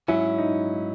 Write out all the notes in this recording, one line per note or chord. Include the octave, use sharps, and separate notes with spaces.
G#2 F#3 C#4 E4
D#4